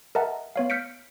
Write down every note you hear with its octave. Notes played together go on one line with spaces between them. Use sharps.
A#4 D#5 E5 F#5 A5 A#5
B3 C#5 F5
F6 G6 B6 C#7 D7